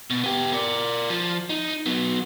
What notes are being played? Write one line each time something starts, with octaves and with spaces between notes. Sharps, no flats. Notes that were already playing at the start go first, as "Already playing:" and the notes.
B2
B3 G4
A#4 D5
F3
D#4
F#3 B3